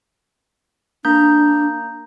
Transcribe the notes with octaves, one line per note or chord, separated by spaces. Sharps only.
A#3 D4 A#5 G6